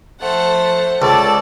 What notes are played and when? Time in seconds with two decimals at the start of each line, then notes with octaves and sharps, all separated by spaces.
0.21 F3 A3 C5 F#5
1.02 C#2 A4 D5